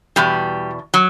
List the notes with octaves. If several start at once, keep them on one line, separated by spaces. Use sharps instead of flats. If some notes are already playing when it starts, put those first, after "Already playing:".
E2 B2 G3
F#3